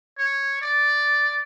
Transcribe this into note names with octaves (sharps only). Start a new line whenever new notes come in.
C#5
D5